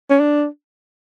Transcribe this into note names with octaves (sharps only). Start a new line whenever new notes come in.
C#4
D4